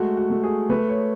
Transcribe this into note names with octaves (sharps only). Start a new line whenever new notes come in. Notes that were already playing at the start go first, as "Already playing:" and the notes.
Already playing: G#3 A3 F#4
F#4
A3
G#4
A3 B4
C#5